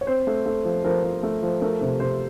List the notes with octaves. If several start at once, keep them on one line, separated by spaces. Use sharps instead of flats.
C#5
C4 C5
A3
A3
F3
F3 A#4
F3
A3
F3
A3 A#4
C3
C3 C5